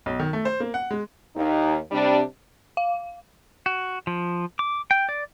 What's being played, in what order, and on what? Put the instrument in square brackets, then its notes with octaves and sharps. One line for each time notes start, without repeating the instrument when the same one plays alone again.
[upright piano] B1
D#3
A3
C5
A#3
F#5
G#3
[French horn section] D#2 D#4
C3 G3 D4
[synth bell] F5
[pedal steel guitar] F#4
F3
D6
G5
D5